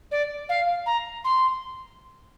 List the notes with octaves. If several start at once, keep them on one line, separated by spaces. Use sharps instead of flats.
D5
F5
A#5
C6